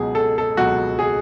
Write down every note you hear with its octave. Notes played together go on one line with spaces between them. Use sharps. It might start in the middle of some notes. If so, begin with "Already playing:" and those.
Already playing: C#2 B2 F#3 G#4
A4
A4
C#2 B2 F#3 F#4
G#4